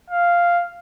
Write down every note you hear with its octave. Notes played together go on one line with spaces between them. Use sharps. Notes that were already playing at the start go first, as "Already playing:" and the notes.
F5